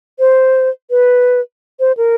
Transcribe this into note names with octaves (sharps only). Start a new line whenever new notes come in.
C5
B4
C5
A#4